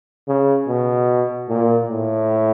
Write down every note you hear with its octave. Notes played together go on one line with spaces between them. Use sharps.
C#3
B2
A#2
A2